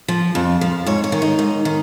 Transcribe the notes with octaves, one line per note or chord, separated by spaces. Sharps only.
F3
F2
F3
G#2 C#5
C#5
D#3
D#4
G#2
D#3